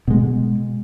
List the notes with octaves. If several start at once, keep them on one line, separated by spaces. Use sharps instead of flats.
B2 G#3